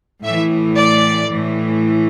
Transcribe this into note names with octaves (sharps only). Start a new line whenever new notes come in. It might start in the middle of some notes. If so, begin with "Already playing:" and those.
A2 E3 E5
D5
A2 E3